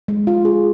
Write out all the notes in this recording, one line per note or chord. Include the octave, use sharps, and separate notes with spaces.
G#3
F4
G#4